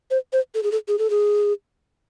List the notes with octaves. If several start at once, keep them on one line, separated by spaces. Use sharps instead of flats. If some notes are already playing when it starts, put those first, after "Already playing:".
C5
C5
A4
G#4
A4
G#4
A4
G#4